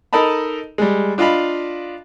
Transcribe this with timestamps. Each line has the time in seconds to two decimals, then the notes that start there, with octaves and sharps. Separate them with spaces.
0.13 D#4 A4 A#4 D#5 A5 B5
0.78 G3 G#3
1.18 D4 F4 D#5 F5 B5